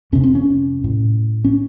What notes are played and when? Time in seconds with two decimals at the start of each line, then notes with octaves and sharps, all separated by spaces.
0.12 F2 C3 C#4
0.24 C4
0.35 C#4
0.84 A2
1.44 C#4